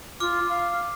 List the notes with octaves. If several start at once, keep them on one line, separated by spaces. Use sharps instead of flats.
F4 D6 F6
F5